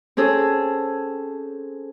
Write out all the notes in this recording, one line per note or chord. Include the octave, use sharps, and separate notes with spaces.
C4 C#4 G#4 A4